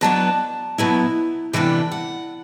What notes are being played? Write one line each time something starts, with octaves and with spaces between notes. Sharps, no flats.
B2 F#3 B3 D4 A5
B2 F#3 B3 E4
C3 E3 G3 B3 D4 G5
F#5